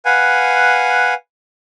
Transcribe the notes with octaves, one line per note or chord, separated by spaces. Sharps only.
B4 F5 F#5 G#5